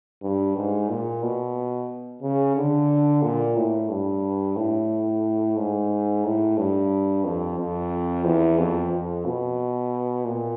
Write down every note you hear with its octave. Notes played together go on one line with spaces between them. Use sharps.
G2
G#2
A#2
B2
C#3
D3
A#2
A2
G2
A2
G#2
A2
G2
F2
F2
E2
F2
F2
B2
A#2